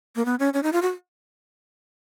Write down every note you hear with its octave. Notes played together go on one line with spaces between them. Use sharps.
A#3
B3
C#4
C#4
D#4
F4
F#4